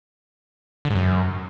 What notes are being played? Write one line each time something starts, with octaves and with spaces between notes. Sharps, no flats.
D3
G#2
F#2